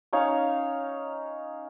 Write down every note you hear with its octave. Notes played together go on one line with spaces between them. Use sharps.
C#4 D#4 C#5 F5